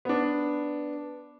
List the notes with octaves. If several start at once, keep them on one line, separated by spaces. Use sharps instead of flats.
B3 D4